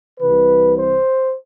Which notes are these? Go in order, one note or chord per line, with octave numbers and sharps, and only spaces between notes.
C2 C3 E3 B4
C5